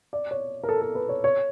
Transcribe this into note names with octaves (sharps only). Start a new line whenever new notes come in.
D5
C#5
A#4
A4
A4
B4
C#5
C#5